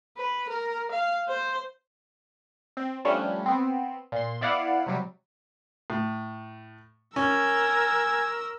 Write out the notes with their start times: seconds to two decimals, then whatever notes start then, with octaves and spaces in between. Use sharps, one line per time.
0.17 B4
0.49 A#4
0.91 F5
1.28 C5
2.77 C4
3.05 F3 G3 A3 C#4 D4
3.46 B3 C4
4.12 A#2 C6
4.41 B3 E4 D5 F5 F#5
4.86 C3 F#3 G3
5.90 A2
7.16 C#4 A#4 G#5 E6